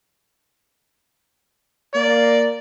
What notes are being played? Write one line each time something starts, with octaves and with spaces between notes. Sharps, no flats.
A#3 D5